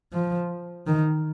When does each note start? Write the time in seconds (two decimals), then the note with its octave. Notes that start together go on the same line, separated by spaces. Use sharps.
0.13 F3
0.87 D#3